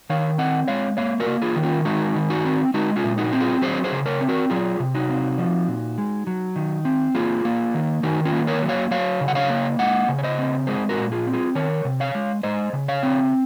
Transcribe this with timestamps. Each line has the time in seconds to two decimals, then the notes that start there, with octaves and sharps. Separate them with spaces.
0.10 D#3 C#5 F5
0.38 C4 D#5 F#5
0.68 G#3 C#5 F5
0.97 A#3 C#5 F5
1.20 F#4 A#4
1.26 A#3
1.42 F4 G#4
1.56 D#3
1.63 C#4 F4
1.85 G#3 D#4 F#4
2.16 D#3
2.30 D#4 F#4
2.45 C4
2.74 G#3 D#4 F#4
2.96 C#4 F4
3.04 A#2
3.18 D#4 F#4
3.33 C4
3.40 F4 G#4
3.62 F#3 G#4 C5
3.84 G#4 C5
3.92 C#3
4.06 A#4 C#5
4.21 C4
4.29 F#4 A#4
4.50 F#3 F4 G#4
4.80 C3
4.95 D#4 F#4
5.10 C4
5.38 F3
5.68 A#2
5.98 G#3
6.27 F#3
6.56 D#3
6.85 C4
7.15 A#3 F4 G#4
7.45 A#3
7.74 D#3
8.03 D#3 D#4 F#4
8.25 C#4 F4
8.32 A#3
8.47 A#4 C#5
8.62 F#3
8.69 C#5 F5
8.91 F#3 C#5 F5
9.21 C#3
9.28 F#5
9.35 C#5 F5
9.50 A#3
9.79 G#3 D#5 F#5
10.09 C#3
10.19 C#5
10.23 C5 D#5
10.39 C4
10.67 G#3 G#4 C5
10.89 F#4 A#4
10.97 A#2
11.12 F4 G#4
11.27 C4
11.33 F4 G#4
11.55 D#3 A#4 C#5
11.85 C3
12.00 C#5 F5
12.15 G#3
12.43 G#3 C5 D#5
12.73 C#3
12.88 C#5 F5
13.03 C4